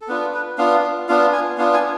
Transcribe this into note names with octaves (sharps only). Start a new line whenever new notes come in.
A4
B3 D4 F4 B4
B4
B3 D4 F4 F5
B3 D4 F4 F5
G#5
B3 D4 F4 F5
G#5